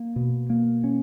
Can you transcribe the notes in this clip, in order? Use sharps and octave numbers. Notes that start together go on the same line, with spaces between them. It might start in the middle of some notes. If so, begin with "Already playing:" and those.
Already playing: A#3
B2
A#3
C#4